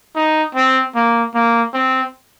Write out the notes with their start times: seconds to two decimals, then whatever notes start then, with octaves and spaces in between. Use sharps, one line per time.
0.15 D#4
0.55 C4
0.95 A#3
1.35 A#3
1.74 C4